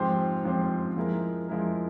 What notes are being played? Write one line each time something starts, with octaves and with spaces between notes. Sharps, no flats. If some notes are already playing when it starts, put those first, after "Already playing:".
Already playing: G#2 F3 C4 G4 C5
G#2 F3 C4 G4 C5
F3 G#3 E4 A#4
F3 G#3 E4 A#4